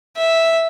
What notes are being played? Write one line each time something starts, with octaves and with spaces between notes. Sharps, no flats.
E5